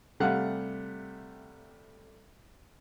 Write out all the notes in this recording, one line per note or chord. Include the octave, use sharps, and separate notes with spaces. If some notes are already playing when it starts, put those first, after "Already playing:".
C3 G3 A3 F5 F#5